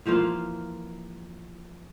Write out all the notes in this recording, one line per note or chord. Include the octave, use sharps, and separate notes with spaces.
E3 F3 A#3 F4